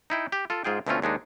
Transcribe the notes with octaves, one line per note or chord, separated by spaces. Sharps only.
D#4 E4 G5
G4
F4 A4
G#2 F4 G#4 G5
D2 B2 A3 C4 C#4 F4
D#2 G#3 D4 D#4